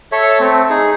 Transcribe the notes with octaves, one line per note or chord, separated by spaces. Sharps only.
A4 C#5 E5
A3 C4
D#4 G#4